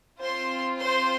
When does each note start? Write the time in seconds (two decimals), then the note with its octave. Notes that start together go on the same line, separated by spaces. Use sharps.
0.19 C4 F4 C5 C6
0.79 C5 C6